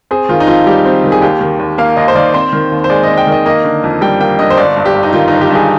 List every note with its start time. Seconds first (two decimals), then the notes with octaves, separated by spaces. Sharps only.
0.11 C4 G#4
0.29 D#3 F4
0.40 D#4
0.47 F2 F4
0.67 G3 G4
0.86 C4
1.04 D#3
1.12 G#4
1.22 D#2 G4
1.41 D#3
1.59 D#2
1.78 A#3 F5
1.96 D#2 D#5
2.08 C5
2.15 D#3 D5
2.34 C4 C5
2.53 D#3
2.72 D#2
2.84 C5
2.90 G#3 D5
3.03 C4 D#5
3.18 G5
3.27 D#3 D#5
3.46 A#3 D#5
3.65 D3
3.84 F2
4.01 G3 G5
4.20 A#3 G5
4.39 D3 D#5
4.50 C5
4.57 G1 D5
4.76 G2
4.85 G4
4.94 G1
5.03 D#4
5.13 D#3 F4
5.28 G1 D#4
5.41 G4
5.51 G2 G#4